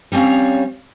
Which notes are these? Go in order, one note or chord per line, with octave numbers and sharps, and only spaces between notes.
G3 C4 C#4 C#5 F5